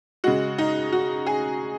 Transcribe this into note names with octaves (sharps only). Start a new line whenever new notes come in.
C#3 G#3 F#4
D#4
F#4
G#4